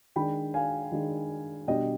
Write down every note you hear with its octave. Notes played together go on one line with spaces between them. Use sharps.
D#3 G#3 D4 G5 B5
F5 G#5
D#3 G#3 D4
B2 G3 D4 D#5 G5